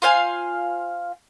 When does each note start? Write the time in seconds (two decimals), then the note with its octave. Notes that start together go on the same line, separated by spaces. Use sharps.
0.02 F4 C5 F5 G#5